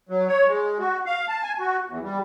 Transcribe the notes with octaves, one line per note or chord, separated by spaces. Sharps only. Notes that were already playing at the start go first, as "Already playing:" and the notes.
F#3
C#5
G#3
F#4
F5
A5
G#5
F#4
E2
G3